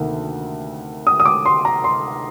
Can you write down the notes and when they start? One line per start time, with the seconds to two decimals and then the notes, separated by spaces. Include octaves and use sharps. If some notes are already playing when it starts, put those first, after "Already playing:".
Already playing: D2 C3 D#3 A#3
1.07 D#6
1.20 D#6
1.26 D6
1.46 C6
1.65 A#5
1.84 C6